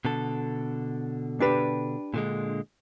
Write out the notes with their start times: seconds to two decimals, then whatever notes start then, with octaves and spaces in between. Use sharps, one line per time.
0.05 B2 D3 A4
1.40 D4 G4 B4
2.14 A#2 D3 G#3